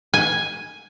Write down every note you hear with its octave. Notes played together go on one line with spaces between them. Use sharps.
G#5